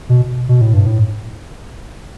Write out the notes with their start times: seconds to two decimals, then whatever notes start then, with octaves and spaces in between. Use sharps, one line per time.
0.09 B2
0.49 B2
0.61 A2
0.74 G2
0.86 A2